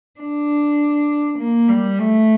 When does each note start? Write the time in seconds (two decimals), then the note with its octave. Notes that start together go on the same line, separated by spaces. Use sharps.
0.20 D4
1.38 A#3
1.68 G3
1.98 A3